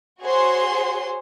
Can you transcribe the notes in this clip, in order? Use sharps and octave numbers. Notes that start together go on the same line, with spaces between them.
F#4 G#4 C5 C#5 G#5 C6